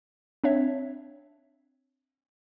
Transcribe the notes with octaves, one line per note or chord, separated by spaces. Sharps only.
C4 D4 C#5 E5